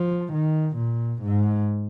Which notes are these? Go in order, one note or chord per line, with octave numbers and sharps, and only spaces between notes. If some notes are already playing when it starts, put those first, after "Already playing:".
Already playing: F3
D#3
A#2
G#2